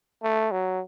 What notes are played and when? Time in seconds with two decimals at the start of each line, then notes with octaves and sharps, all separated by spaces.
0.23 A3
0.52 F#3